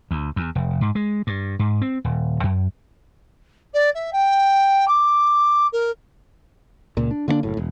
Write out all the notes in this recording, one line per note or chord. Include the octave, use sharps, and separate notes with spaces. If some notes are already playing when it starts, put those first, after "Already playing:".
D2
E2
F1
G#2
G#3
G2
G#2
C4
D#1
F#2
D5
E5
G5
D6
A#4
C#2 A#2
D4
D3 A#3 C4 D4
F#1 A2
E1